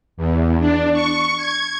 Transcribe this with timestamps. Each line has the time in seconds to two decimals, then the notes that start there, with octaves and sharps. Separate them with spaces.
0.17 E2
0.59 D4
0.93 C#6
1.37 G#6